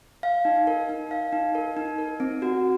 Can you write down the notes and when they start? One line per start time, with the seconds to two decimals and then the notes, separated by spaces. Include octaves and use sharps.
0.23 F5
0.45 D#4
0.67 A#4
0.89 D#4
1.11 F5
1.33 D#4
1.55 A#4
1.77 D#4
1.98 A#4
2.20 C4
2.42 F#4